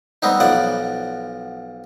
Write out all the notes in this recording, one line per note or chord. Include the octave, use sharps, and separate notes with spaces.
G3 B3 C4 D#4
B1 F3 D5 F#5